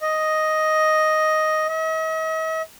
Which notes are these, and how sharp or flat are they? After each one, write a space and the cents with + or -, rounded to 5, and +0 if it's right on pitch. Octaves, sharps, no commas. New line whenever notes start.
D#5 +5
D#5 +45